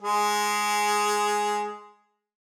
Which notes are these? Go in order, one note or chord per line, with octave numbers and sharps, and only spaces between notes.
G#3 G#4